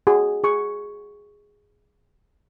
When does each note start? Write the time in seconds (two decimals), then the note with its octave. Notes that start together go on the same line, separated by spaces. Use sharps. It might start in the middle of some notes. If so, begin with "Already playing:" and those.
0.07 F#4 G#4
0.44 G#4 C#6